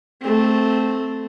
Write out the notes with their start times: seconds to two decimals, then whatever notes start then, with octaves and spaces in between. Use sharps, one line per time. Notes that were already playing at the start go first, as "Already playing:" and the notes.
0.21 A3 C4